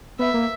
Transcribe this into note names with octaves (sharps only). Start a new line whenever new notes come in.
B3 E5
A#3